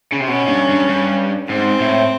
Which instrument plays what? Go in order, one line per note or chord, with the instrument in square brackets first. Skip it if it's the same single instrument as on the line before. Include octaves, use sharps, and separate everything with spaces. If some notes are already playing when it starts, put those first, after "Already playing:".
[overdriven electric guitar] C#3
C3
[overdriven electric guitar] B2 [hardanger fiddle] C#4
[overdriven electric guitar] G2
G2
G2
[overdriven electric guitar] G#2 [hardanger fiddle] C4
[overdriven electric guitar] A2